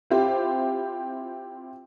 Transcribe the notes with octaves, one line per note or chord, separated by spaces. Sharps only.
C4 E4 F4 G4 C5